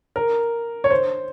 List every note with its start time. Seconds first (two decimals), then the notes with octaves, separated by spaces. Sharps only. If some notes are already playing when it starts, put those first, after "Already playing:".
0.16 A#4
0.84 C#5
0.91 C5